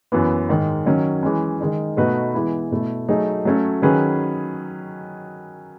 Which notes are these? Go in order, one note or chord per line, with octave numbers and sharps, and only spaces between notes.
F#2 E3 B3
G#2 D#3 G#3
D#3 F#3 C#4
E3 G#3 C#4
D#3 G#3 D#4
B2 A3 D#4 F#4 B4
E3 G#3 B3 E4
B2 A3 E4
F#3 A3 D#4 G#4
F#3 A3 C#4
D#3 F#3 C#4 G#4 B4